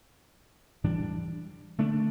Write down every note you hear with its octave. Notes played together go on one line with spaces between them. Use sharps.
A2 E3 G3 D4
D3 A3 D4